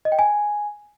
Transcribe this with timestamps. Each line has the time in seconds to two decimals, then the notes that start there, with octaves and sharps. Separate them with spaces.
0.05 D#5
0.12 G5
0.19 G#5